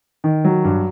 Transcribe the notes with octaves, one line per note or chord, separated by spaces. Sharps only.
D#3
F#3
G2